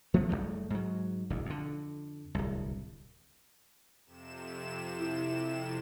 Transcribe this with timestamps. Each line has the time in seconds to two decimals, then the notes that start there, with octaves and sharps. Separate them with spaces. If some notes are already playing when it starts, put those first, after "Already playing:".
0.14 F3 A3 B3
0.29 F#1 G2 G3 A3
0.70 G#2 F#3
1.30 E1 D2
1.46 F2 D3
2.35 D1 C2
4.06 F2 C3 E7
4.98 E4